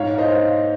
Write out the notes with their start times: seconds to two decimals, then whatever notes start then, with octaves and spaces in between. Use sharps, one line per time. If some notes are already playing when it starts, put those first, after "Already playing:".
Already playing: G#2 C#5 F5
0.18 C5 D#5
0.29 F5